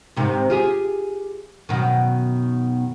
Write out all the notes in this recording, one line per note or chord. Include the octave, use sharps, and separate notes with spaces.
G#2 C3 D#3
F4 G4 G#4
F#2 B2 D#3